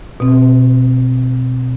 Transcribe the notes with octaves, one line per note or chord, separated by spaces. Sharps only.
B2 C4